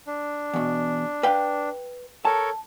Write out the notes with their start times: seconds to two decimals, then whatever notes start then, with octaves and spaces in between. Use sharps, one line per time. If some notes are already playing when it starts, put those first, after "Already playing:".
0.07 D4
0.54 E2 B2
1.23 B4 F5 G5
2.25 A4 A#4 C#5 A5